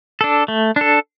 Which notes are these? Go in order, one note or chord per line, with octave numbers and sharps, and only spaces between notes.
D4 A4
A3
D4 A4